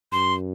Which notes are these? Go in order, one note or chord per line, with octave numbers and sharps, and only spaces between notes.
F#2 C6